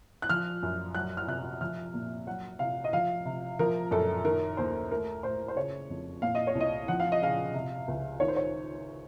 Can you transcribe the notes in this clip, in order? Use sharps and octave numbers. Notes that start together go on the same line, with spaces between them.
F#6
F3 F6
F#2
F#3 F#6
F6
C3 F#6
F3 F6
A#2
F#3 F#5
C3 F5
D#5
F3 F5
C3
F3 A#4
F#2 A4
D#3 A#4
D#2 C5
A3 A#4
A2 C5
C5
C#3 C#5
F2
A#2 F5
D#5
C#5
C2
D#5
F3 F#5
F5
D#5
C#3 F5
C3
C#2
D#3 C#5
C5
C#5